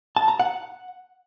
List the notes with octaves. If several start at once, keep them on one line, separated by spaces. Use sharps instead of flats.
A5
A#5
F#5